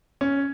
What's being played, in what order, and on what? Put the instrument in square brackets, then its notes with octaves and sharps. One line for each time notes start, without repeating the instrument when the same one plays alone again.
[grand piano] C#4